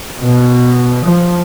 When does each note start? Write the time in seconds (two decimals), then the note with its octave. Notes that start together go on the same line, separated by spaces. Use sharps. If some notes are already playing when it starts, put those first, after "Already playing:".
0.20 B2
1.04 F3